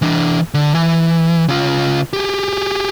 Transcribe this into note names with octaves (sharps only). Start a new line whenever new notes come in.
E3 D4
D3
E3
C#3 F4
G4 G#4